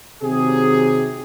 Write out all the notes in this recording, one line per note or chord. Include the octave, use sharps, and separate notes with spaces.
C3 D#3 F#3 G4 G#4